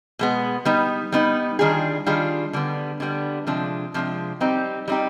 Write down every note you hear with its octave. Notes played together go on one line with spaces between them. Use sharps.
B2 G#3 B3
G3 B3 D#4
G3 B3 D#4
D#3 G3 D4 F4 G#4
D#3 G3 D4 F4 G#4
D3 G3 B3
D3 G3 B3
C3 F3 G#3 D4
C3 F3 G#3 D4
G3 C4 D#4 G4
G3 C4 D#4 G4